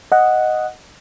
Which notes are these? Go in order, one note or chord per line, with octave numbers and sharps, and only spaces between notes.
D#5 F#5